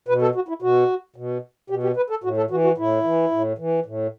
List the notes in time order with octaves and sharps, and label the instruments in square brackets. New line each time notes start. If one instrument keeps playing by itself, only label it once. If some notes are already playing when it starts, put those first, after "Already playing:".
[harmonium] B2 B4
A4
F#4
E4
B2 F#4
B2
B2 G4
G4
B4
A4
A2 F#4
A4
E3 F#4
F#4
A2 E4
E3
A2
E3
A2